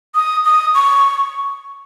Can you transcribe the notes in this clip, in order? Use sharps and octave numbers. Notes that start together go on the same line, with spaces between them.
D#6
D#6
C#6